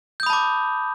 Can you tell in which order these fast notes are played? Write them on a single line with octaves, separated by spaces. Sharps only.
G6 D#6 B5 A5 D6